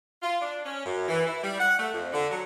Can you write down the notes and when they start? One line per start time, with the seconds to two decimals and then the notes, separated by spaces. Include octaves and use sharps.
0.22 F4
0.40 D4
0.65 C#4
0.85 F#2
1.08 E3
1.26 E4
1.42 G3
1.59 F#5
1.78 A3
1.92 F2
2.12 D3
2.30 F#3